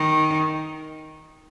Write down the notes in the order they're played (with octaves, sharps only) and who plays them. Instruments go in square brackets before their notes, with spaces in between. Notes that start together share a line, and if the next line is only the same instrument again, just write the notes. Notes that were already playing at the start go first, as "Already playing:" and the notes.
Already playing: [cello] D#3